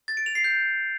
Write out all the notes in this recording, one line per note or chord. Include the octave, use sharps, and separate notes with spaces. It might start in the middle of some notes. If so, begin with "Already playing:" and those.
A6
D7
F7
C7
G6